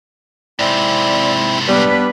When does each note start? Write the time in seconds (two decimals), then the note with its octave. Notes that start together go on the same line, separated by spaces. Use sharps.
0.59 G#2 C3 C4 E4 D5
1.68 G3 B3 D4 B4